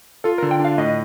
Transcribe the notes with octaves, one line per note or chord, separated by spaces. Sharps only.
F4 A4
A#4
D3
G5
D4 F5
A2 D#5